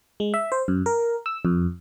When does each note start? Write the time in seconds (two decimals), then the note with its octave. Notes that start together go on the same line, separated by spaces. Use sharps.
0.20 G#3
0.34 E5
0.52 C5
0.68 F#2
0.86 A#4
1.26 E6
1.45 F2